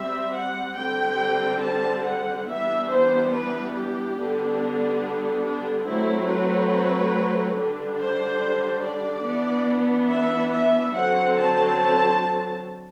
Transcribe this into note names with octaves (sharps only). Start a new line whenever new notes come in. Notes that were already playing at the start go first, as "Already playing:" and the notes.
Already playing: G3 C4 E5
F#5
D3 G3 C4 G5
A5
F#5
E3 G3 B3 D4 E5
C5
B4
G4
D3 G3 B3 D4
D4
F#3 A3 C4 E4
B4
D3 G3 D4
C5
D5
E3 B3 D4
E5
E5
D3 F#3 C4 F#5
A5